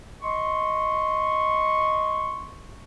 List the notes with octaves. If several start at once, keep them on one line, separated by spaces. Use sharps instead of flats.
D#5 C6 C#6